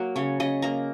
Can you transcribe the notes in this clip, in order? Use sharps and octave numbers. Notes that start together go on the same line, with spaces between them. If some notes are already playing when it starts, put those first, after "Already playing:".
Already playing: F#3 A#3 F#5
C#3 C#5
C#3 D#5
A#3 A#5